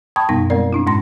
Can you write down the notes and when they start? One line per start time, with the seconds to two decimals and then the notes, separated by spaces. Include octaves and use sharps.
0.16 G5 A5 B5 C#6 D#6 G#6
0.29 F#2 B2 G3 B3 D#4 A#6
0.50 G3 G#3 C4 A#4 D5
0.73 C4 D4 E4
0.87 G#2 G#3 C#4 C6 A#6